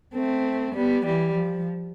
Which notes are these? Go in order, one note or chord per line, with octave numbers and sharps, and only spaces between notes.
A3 C4
G3 B3
E3 G3
F3